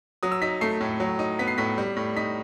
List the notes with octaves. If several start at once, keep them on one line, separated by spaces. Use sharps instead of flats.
F#3 D#6
E6
D#4 B6
A3 C7
A2
F#3
D#4
B3 B6
C7
A2 B6
G3
A2
D#4 B6